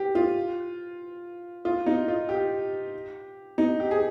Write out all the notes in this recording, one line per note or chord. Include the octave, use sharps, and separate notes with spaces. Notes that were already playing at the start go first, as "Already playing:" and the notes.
Already playing: G4
F4
F4
D#4
F4
G4
D#4
G4
G#4